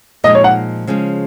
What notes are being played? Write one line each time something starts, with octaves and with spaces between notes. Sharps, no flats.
A#2 F3 G#3 D#4 D#5
C#5
F#5
C#3 F3 G#3 C#4